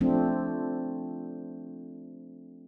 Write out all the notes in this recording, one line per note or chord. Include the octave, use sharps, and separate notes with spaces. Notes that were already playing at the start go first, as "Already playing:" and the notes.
F3 A3 C4 D4